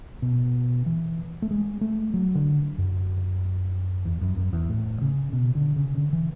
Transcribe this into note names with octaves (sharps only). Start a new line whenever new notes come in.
B2
E3
A3
G#3
A3
F#3
D3
F#2
E2
F#2
F#2
E2
A2
C#3
B2
D3
C#3
D3
E3